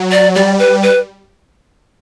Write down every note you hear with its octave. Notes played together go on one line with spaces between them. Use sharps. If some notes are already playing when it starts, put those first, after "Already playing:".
Already playing: F#3
D5
G3 D5
B4
B4